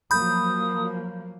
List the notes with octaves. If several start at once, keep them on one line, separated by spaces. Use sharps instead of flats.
F3 F#3 A#3 B5 D#6 G6